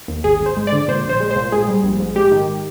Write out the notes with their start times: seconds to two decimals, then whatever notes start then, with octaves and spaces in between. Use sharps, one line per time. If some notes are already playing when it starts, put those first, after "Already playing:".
0.08 D#2
0.24 G#1 G#4
0.40 G#1
0.46 C5
0.56 G#3
0.67 D5
0.72 D3
0.88 A#2 C5
1.05 A#1 C5
1.20 G#3
1.31 C5
1.36 A#2
1.52 G#2 G#4
1.68 G3
1.84 A#1
2.00 G#2
2.15 G#3 G4
2.31 D#3